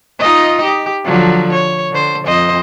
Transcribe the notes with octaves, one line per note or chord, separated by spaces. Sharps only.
D#4 F4 D#5
G4
D3 F3 F#3
C#5
D3 C5
F2 C5 D#5